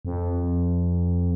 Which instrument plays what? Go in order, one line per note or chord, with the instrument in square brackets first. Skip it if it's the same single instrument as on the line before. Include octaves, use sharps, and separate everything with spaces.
[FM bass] F2